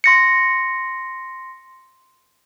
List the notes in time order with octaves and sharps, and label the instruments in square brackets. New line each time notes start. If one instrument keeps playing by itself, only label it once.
[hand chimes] C6 A#6 C#7